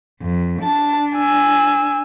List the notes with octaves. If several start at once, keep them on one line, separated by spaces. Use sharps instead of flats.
F2
D4 A5
G#5 E6